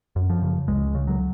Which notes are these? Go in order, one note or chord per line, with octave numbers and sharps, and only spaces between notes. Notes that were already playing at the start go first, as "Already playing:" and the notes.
F#2
F3
C#3
C#2 G#3
C#3
F#3